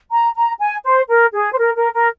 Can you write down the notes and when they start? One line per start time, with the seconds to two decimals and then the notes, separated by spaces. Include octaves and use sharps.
0.12 A#5
0.36 A#5
0.59 G#5
0.85 C5
1.09 A#4
1.33 G#4
1.52 C5
1.58 A#4
1.75 A#4
1.94 A#4